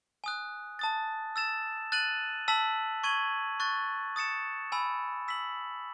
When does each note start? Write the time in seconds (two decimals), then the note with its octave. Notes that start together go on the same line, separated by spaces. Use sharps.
0.24 G#5 D#6 F#6
0.79 A5 D#6 A6
1.36 E6 A6 E7
1.92 F#6 A6 D#7 F#7
2.48 A5 E6 B6 F#7
3.04 C#6 G#6 D#7 F#7
3.60 C#6 F#6 A6
4.16 D#6 A6 C#7 E7
4.72 G#5 B5 E6
5.28 E6 B6 F#7